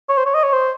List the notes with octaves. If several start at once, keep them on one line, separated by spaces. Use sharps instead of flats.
C#5
C5
C#5
D#5
C#5
C5